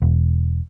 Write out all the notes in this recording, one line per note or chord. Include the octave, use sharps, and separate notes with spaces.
E1